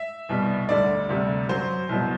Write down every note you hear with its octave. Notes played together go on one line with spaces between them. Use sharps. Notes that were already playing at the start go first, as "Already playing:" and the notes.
Already playing: E5
C2 B2 G3
D2 D3 G3 D5
D2 C3 G3
F#2 F#3 C5
C2 B2 F#3